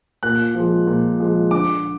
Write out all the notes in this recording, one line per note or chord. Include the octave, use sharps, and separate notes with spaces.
A#2 F#6
F3 G#3
A#2
F3 G#3
D3 D6